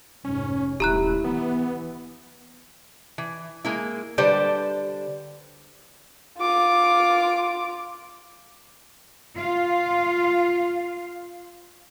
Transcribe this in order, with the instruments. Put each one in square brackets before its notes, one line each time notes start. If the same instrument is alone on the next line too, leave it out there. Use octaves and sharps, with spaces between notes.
[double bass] F1 G#2 [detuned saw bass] C#4
[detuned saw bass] D#1 [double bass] A3 E4 [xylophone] G4 A#5 F#6
[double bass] E3 [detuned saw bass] B3
[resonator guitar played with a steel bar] E3
G#3 A#3 E4
D3 G3 G4 B4 C5 D5
[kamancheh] F4 D6
[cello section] F4 F5